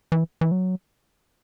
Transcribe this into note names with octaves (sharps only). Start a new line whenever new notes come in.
E3
E3
F#3